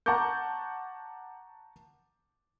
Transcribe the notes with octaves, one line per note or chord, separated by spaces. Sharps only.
F#5 A5 A#5 C#6 D6 G6